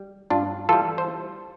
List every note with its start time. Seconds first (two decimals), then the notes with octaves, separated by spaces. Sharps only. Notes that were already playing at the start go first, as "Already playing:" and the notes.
Already playing: G3
0.30 G2 D4 F4
0.69 E3 G3 F4 A4
0.98 C5